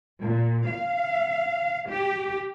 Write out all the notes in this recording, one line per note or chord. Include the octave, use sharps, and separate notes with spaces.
A#2
F5
G4